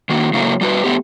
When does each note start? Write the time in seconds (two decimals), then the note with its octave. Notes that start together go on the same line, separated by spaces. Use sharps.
0.09 D#3 A#3 F#4
0.33 A2 C#3 F#3 A3 A#3
0.61 G3 F#4 B4
0.84 A3 B3 G4